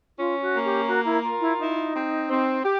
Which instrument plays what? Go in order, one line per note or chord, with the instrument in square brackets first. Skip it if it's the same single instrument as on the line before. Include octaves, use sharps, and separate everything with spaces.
[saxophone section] C#4 [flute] F4
[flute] F#4
[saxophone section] A#3
[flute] G4
[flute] F#4 [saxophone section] A#4
[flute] E4
[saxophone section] F4
[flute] E4
[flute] D#4 [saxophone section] E4
[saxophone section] C4
C4
G4